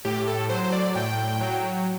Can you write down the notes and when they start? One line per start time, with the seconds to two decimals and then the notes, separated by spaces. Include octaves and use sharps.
0.05 A2 G4
0.28 A4
0.50 F#3 C5
0.64 C5
0.72 D5
0.95 A2 G5
1.41 F#3